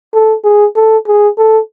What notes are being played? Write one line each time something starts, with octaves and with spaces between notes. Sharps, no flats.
A4
G#4
A4
G#4
A4